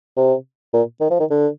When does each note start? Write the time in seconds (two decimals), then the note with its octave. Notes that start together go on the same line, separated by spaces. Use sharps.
0.17 C3
0.73 A#2
1.01 D#3
1.10 F3
1.20 D#3
1.30 D3